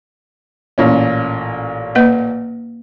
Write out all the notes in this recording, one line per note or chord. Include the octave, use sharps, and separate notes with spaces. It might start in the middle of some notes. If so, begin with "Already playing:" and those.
A1 A#2 C#4
A#3 B4 D#5